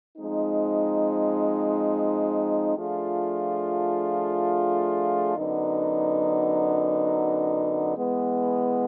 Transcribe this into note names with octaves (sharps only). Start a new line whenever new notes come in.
F3 G#3 C4 D#4
F3 A3 D4 F4 G#4
F#2 D3 F#3 B3 D#4
E3 G#3 B3